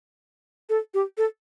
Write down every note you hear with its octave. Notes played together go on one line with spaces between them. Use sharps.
A4
G4
A4